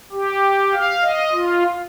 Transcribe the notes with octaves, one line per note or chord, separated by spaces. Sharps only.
G4
F5
D#5
F4